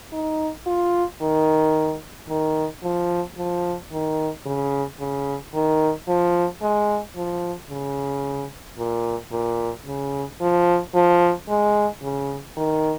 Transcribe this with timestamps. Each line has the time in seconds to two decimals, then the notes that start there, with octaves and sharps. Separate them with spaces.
0.12 D#4
0.66 F4
1.21 D#3
2.28 D#3
2.83 F3
3.37 F3
3.92 D#3
4.46 C#3
4.99 C#3
5.54 D#3
6.08 F3
6.61 G#3
7.16 F3
7.69 C#3
8.78 A#2
9.32 A#2
9.86 C#3
10.41 F3
10.94 F3
11.49 G#3
12.02 C#3
12.56 D#3